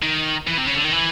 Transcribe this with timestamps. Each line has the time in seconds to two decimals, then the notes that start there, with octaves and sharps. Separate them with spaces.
0.02 D#3
0.48 E3
0.58 C3
0.67 C#3
0.75 D3
0.84 D#3
0.93 E3